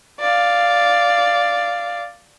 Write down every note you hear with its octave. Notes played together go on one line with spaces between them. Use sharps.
D5 F5